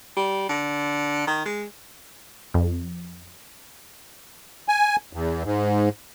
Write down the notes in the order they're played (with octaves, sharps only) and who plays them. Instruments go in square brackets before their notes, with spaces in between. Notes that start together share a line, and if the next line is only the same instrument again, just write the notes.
[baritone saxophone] G3
D3
D#3
G#3
[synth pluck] F2
[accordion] G#5
E2
G#2